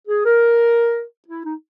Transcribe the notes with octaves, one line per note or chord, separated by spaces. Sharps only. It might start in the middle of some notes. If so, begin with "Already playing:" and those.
G#4
A#4
E4
D#4